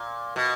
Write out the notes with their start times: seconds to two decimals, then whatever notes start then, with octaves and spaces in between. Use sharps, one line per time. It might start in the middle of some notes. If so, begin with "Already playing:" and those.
Already playing: A#2
0.36 B2